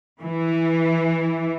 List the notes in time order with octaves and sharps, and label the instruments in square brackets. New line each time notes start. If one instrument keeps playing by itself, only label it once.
[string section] E3